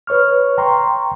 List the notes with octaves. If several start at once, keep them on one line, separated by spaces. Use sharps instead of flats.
B4 C#5 C#6 F6
G5 A#5 C6 C#6